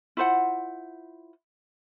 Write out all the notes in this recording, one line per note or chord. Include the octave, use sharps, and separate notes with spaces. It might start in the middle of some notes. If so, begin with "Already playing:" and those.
E4 F4 C5 F#5